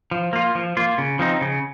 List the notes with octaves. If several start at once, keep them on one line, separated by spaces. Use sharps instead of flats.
F3
A#3 F4
F3
A#3 F4
C#3
F3 C4 D#4
C#3